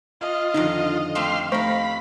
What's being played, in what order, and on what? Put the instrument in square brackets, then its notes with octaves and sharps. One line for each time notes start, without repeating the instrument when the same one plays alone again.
[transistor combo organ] F4 [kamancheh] D#5
[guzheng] F2 D3 D#3 [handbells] D#4
[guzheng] A3 C4 G4 [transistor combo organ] F5 C6
[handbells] A3 C5 C#6 [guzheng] D#4 A#4 [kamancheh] F5 [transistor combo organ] B5